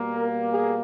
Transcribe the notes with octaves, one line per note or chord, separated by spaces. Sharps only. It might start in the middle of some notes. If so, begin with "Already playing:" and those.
Already playing: B2 G3 A#3
A#4
G#4